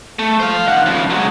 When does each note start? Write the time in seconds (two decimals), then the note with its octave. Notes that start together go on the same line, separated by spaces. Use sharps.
0.19 A3
0.40 C5 F5
0.66 D#3 F#5
0.86 C#3 F3
1.10 F#3 G#3